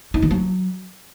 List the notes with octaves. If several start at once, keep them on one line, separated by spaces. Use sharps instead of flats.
D#4
D#3
F#3